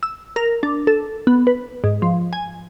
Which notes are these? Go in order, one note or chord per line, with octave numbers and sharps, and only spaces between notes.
E6
A#4
D4
A4
B3
B4
G#2
F3
G#5